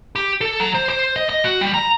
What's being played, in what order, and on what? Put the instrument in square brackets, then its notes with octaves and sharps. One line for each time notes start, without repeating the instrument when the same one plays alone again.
[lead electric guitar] G4
A4
F#3
C5
C5
D#5
D#5
F#4
G3
A#5